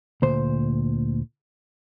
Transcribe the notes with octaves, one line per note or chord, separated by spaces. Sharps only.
D2 A#2 C5